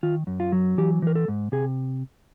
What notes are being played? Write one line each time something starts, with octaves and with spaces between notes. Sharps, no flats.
D#3 F4
F#2
F4
F#3
E3 G4
E3 A#4
A4
G#2
C3 G#4